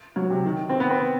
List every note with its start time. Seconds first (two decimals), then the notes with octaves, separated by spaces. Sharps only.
0.16 F#3
0.30 C3
0.45 D#3
0.69 C4
0.80 B3
0.90 C4